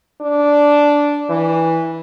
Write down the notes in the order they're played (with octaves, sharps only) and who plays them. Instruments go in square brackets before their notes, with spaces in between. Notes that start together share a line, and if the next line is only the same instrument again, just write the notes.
[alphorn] D4
E3